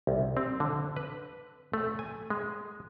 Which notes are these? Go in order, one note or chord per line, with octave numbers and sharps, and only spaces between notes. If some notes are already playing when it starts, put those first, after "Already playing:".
C2
C4
D3
B4
A3
G#5
G#3